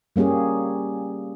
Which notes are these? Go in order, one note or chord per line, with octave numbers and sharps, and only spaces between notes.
G3 A#3 C#4 G4 G#4